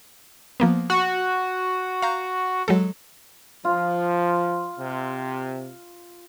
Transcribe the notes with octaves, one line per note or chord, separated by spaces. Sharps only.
F3 A#3 B3
F#4
F5 A#5 G6
F#3 G#3 A4
F3 F4
C3